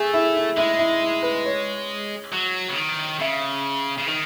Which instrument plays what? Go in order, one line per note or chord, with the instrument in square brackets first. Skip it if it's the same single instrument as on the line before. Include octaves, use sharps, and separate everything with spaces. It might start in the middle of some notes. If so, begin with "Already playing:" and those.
Already playing: [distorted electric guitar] A3 [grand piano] G#4
[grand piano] E4
E4
[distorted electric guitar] G#3 [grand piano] E4
[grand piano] E4
E4
B4
C#5
[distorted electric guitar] F#3
C#3
D#3
[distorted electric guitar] C#3 [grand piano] E5
[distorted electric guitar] C#3
D#3